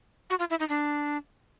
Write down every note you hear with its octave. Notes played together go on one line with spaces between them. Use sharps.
F#4
F4
E4
D#4
D4